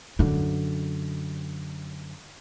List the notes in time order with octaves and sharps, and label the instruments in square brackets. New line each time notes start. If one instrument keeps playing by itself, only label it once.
[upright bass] F#2 D3